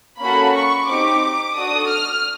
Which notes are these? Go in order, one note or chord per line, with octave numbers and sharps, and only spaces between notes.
A#3 C#4 F#4 A4 B5
C#6
C4 D#4 G4 D6
D4 F#4 A4 D#6
F6